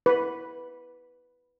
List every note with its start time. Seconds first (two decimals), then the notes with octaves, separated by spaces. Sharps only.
0.06 B4